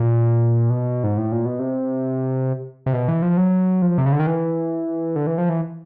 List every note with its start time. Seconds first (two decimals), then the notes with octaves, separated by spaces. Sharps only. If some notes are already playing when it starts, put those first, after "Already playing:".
Already playing: A#2
0.70 B2
1.04 G#2
1.18 A2
1.32 A#2
1.45 B2
1.59 C3
2.86 C3
2.93 B2
3.08 E3
3.22 F3
3.37 F#3
3.82 F3
3.98 C3
4.06 C#3
4.12 D3
4.20 D#3
4.27 E3
5.16 D3
5.27 E3
5.38 F3
5.49 E3